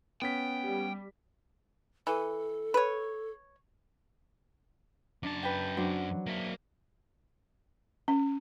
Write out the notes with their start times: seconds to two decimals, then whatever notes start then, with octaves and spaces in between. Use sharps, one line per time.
0.22 B3 C#4 G5 B6
0.64 G3
2.07 E3 A4
2.74 B4 C#5
5.23 F#2 D4 A5
5.43 B4 G5
5.77 F#3 C4 D4
6.27 A#3 E5
8.08 C#4